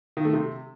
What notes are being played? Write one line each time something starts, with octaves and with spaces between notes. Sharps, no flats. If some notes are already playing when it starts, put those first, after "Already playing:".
D#3
A3
C3